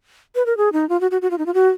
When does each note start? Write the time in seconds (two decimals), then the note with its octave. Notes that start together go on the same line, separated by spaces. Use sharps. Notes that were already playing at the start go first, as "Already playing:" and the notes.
0.35 B4
0.46 A#4
0.57 G#4
0.73 D#4
0.89 F4
1.01 F#4
1.11 F#4
1.22 F#4
1.31 F4
1.38 D#4
1.46 F4
1.54 F#4